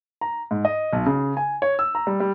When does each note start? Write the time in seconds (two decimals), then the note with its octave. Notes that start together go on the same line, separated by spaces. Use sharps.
0.21 A#5
0.51 G#2
0.65 D#5
0.93 B1
1.06 C#3
1.37 G#5
1.62 C#5
1.79 E6
1.95 A#5
2.07 G3
2.20 G3